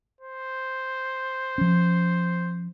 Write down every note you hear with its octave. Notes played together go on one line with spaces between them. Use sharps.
C5
F3 C#4